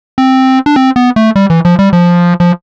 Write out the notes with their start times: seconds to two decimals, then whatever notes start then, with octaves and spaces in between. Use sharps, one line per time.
0.18 C4
0.66 D4
0.76 C4
0.96 B3
1.16 A3
1.36 G3
1.50 E3
1.65 F3
1.79 G3
1.93 F3
2.40 F3